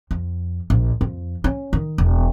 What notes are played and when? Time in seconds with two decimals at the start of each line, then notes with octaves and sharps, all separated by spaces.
0.11 F2
0.70 A#1
1.01 F2
1.44 C#4
1.73 D#3
1.98 E1